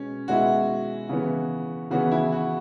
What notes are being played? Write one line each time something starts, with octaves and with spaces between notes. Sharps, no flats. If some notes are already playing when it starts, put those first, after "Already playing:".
Already playing: B2 G#3 B3 C#4
B2 G#3 B3 E4 F#4
C#3 E3 B3
C#3 E3 B3 F#4
E4
F#4